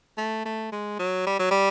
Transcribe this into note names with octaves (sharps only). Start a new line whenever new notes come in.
A3
A3
G#3
F#3
G3
F#3
G3